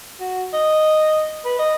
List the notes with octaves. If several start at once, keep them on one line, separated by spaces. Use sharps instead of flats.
F#4
D#5
B4
D#5